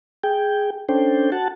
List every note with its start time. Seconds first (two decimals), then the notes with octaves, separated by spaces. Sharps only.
0.24 G#4 G5
0.89 C#4 D4 A4 C5 G5
1.32 F#4 F#5 A5